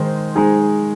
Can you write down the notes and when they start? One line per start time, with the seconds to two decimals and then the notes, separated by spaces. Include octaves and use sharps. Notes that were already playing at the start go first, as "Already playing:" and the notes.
Already playing: D#3 G#3 D#4 C5
0.36 G#3 D#4 G#4